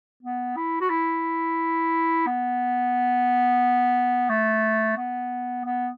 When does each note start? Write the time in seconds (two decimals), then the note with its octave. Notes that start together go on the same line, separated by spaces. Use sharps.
0.23 B3
0.57 E4
0.81 F#4
0.90 E4
2.27 B3
4.29 A3
4.97 B3
5.65 B3